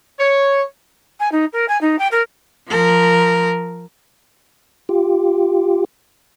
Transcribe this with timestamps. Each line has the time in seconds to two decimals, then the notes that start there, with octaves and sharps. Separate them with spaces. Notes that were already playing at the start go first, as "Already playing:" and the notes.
0.19 C#5
1.20 G#5
1.32 D#4
1.53 A#4
1.68 G#5
1.81 D#4
1.99 G5
2.11 A#4
2.68 F3 A#4
4.89 F4 G4